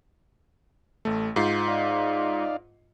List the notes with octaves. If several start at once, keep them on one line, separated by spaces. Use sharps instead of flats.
A1 A3
G#2 F4 C7
D#4 D5 F5